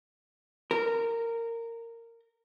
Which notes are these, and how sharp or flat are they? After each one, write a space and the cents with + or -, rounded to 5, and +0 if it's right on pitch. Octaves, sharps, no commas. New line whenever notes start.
A#4 -15